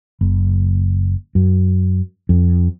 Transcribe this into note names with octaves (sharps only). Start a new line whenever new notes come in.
F#1
F#2
F2